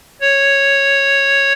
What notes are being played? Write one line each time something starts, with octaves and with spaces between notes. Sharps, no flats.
C#5